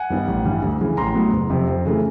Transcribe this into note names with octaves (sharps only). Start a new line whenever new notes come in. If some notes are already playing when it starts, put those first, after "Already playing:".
Already playing: F#5 G#5
G2 D#3 G3 B3
A1
G2 E3 G3
D2
C#3 E3
A1 A#5 C6
A2 F#3 B3
F#1
F2 C3
F2
C#3 E3 A3